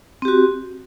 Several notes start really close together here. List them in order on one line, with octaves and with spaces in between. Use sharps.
C4 G4 F#4